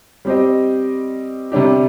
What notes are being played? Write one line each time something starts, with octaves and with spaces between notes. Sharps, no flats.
G3 C4 G4 C5 D#5
C3 G3 D4 G4